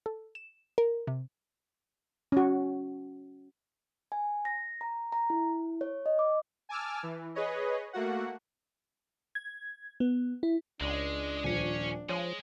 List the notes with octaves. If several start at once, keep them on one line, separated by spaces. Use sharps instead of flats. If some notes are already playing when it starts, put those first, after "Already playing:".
A4
E7
A#4
C3
C#4 F#4
G#5
A#6
A#5
A#5
E4
C#5
D#5
D6
G#5 A5 D6 E6 F6
E3
G#4 B4 C#5 D#5
A3 A#3 F#4 F#5
G#6
B3
E4
C#2 G#3 D4
D#1 F3 C#5 G#5
F3 G#3 C#5